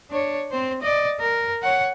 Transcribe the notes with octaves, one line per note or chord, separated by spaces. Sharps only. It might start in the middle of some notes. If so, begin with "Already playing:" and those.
D4 C#5
C4 C5
D5 D#5
A#4
C#5 F#5